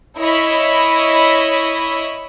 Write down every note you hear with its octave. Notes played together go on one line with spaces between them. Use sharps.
E4 C#5 D#5 B5